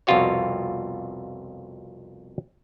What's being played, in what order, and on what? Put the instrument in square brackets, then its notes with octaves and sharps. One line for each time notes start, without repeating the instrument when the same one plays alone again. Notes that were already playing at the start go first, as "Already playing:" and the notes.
[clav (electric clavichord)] C2 F2 B2 F4 F#4 C#5